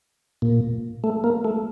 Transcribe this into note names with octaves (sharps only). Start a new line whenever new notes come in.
A#2
A3
A#3
A3